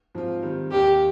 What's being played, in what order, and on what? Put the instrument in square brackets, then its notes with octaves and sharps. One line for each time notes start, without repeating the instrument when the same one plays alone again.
[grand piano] G#2 F3 C4 F4
D#3 G3 C4
[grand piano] D#2 D#3 A#3 D4 [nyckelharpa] G4